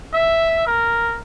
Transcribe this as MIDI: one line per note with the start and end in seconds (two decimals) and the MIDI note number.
0.13 0.63 76
0.66 1.20 70